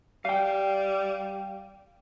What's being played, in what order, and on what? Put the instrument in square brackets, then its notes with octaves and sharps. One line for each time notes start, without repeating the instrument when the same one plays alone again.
[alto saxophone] G3 [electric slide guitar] F5 G5